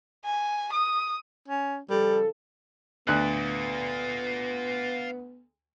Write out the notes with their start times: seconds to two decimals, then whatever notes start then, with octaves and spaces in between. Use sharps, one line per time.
0.25 G#5
0.73 D#6
1.49 C#4
1.90 C#3 F3 G3 A4
3.07 D2 B3 F4 D5 F#6